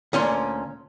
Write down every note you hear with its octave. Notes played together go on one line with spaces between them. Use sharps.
D2 A#2 C#4 C6